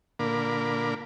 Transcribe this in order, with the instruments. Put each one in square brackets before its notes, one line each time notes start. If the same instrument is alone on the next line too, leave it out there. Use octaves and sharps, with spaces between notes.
[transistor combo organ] A#2 D3 A#3 A#4 B5 D6